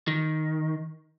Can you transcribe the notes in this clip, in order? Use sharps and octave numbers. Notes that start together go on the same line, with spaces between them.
D#3